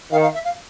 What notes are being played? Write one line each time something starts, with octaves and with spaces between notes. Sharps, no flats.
D#3 F5
F5
E5
F5